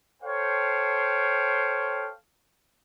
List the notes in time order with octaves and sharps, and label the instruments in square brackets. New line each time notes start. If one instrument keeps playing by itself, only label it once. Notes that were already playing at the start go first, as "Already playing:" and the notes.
[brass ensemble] A4 C5 C#5 F5 G5